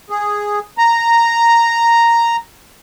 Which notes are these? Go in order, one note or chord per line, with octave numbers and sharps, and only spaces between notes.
G#4
A#5